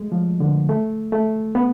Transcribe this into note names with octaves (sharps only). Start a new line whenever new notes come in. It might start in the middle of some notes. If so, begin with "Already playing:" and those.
Already playing: G#3 A3
F3
D3
A3
A3
B3